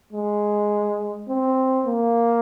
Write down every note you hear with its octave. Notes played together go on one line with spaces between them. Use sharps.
G#3
C4
A#3